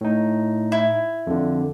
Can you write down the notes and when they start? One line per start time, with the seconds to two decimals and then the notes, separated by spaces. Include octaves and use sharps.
0.01 A2 D#4
0.72 E4
1.27 F2 D3